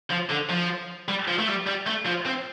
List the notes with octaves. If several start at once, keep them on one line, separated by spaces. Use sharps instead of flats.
F3
D3
F3
G3
F3
A3
G3
G3
A3
F3
C4